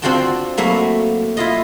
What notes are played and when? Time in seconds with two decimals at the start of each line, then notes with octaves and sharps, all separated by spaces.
0.02 C4 D4 F4 F#4 G5 A5
0.57 F#3 A3 A#3 E4
1.37 E4 F4 D#5